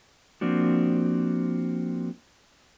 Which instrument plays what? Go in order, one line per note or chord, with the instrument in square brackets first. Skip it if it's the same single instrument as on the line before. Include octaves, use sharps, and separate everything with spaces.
[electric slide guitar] F3 A#3 C4 D4 F#4